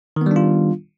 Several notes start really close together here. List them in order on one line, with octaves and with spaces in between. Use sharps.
D#3 B3 G3 D4 F4